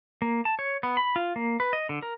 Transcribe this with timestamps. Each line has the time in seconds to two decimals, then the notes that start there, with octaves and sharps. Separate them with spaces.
0.22 A#3
0.45 A5
0.59 C#5
0.83 B3
0.97 B5
1.16 F4
1.36 A#3
1.60 B4
1.73 D#5
1.89 D3
2.02 A#4